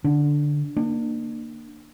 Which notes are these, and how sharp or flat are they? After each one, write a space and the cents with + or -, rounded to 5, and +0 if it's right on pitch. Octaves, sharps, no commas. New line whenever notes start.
D3 +0 D4 +0
A#3 +0 D4 +35